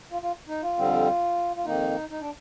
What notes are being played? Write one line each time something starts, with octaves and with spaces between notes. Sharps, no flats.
F4
F4
D#4
F4
F2 D3 G3 C4
F4
F2 D#3 A#3 D#4
D#4
D4